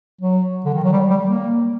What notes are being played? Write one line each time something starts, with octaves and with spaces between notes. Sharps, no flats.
F#3
D3
D#3
F#3
G3
G3
A#3